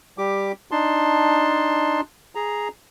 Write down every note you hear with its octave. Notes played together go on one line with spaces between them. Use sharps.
G3 G4 D6
D4 D#4 A5 C6
G#4 A#5